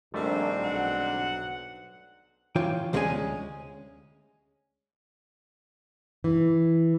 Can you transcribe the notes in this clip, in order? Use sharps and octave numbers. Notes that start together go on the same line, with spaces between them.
A#1 G#2 D#3 G3 A3 C4 D4
B1 F#5
E3 F4 C#5 G5
D2 G#3 A#3 C#4 G#4 G#5
E3